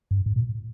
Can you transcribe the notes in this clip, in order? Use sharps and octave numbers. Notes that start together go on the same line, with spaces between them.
G2
G#2
A#2